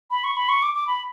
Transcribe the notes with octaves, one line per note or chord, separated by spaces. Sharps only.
B5
C#6
B5
C#6
D6
D6
B5